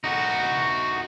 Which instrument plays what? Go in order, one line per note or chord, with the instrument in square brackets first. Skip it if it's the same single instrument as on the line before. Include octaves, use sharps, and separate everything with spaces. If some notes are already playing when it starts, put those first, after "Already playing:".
[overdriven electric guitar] D#4 F#4